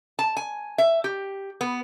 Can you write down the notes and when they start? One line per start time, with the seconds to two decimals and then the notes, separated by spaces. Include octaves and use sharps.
0.19 A5
0.37 G#5
0.78 E5
1.04 G4
1.61 B3